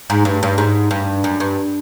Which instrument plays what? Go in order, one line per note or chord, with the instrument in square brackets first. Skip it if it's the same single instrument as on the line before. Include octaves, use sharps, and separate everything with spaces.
[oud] G#2
G2
G2
G#2
G2
F#2
G2